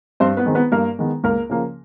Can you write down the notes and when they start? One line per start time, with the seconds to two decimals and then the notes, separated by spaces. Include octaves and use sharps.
0.20 G2 C4 C5
0.37 B3 B4
0.46 D#3 G#3 C4
0.55 B3 B4
0.72 G2 A#3 A#4
0.99 D#3 G#3 B3
1.24 C#2 A#3 A#4
1.49 C#3 F3 A#3